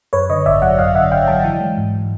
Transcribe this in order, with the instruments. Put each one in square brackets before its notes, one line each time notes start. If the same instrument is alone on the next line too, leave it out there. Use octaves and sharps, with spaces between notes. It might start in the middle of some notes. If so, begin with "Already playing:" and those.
[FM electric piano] F#2 B4 C#5
D3 C#5 D#5
G#1 D5 E5
F#3 E5 F#5
F#2 D#5 F5
D3 E5 F#5
G#1 F5 G5
F#3 G5 A5
E3
G#3
G#2